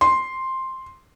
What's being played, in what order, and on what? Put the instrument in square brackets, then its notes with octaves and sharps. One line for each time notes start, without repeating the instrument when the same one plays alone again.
[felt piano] C6